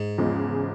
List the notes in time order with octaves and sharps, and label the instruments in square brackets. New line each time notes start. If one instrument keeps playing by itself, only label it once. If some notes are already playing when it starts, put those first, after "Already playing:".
Already playing: [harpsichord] G#2
[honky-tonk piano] E2 C#3 F3 G#3